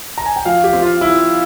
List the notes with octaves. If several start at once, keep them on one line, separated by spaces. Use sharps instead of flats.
A#5
G#5
G5
F3 F5
G4
C4
F4
F3 E4